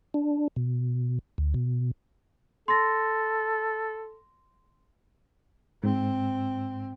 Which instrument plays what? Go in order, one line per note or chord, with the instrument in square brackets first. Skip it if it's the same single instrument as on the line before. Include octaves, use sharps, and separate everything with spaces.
[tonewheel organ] D4
B2
D2
B2
[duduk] A4 [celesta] C6 A#6
[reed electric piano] G#2 [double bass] C4